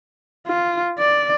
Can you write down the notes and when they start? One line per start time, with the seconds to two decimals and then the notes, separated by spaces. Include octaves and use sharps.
0.47 F4
0.99 D5